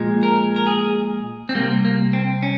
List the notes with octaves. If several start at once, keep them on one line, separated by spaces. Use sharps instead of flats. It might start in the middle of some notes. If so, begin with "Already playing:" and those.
Already playing: A#2 F3 G#3
A#4
A#4
G#4
C4
C3 G3 A#3
A#3
C4
C#4